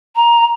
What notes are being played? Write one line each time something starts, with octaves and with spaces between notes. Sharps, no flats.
A#5